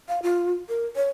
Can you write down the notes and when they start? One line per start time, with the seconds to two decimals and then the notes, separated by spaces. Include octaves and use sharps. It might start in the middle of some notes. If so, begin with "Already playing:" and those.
0.08 F5
0.23 F4
0.69 A#4
0.96 C#5